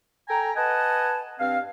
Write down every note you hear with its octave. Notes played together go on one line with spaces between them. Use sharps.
A4 G5 G#5 A#5
B4 D#5 F#5 G#5 A5
G2 C4 F5